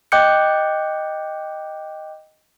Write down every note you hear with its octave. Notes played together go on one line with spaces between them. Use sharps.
D#5 G5 D6 F#6 G6 C#7